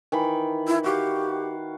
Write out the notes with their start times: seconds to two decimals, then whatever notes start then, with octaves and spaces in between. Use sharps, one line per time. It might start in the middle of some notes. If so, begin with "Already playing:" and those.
0.12 D#3 E3 B5
0.67 E4
0.84 F#4 G4 F5